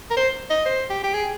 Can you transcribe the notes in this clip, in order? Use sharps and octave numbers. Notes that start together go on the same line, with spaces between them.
A#4
C5
D#5
C5
G4
G4
G#4